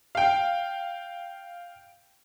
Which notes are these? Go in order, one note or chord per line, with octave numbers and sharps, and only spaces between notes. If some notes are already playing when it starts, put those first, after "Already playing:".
F5 G5